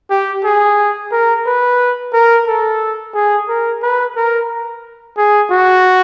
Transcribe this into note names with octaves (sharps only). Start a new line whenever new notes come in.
G4
G#4
A#4
B4
A#4
A4
G#4
A#4
B4
A#4
G#4
F#4